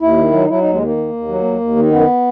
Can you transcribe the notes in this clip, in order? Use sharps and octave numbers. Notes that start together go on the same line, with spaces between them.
D#2 E4
D#3
F#3
D#4
F#3 E4
D#2 D#4
G#3
D#3 A#3
D#2
D#2
F#3
D#2
D#2
D#3
F#2 B3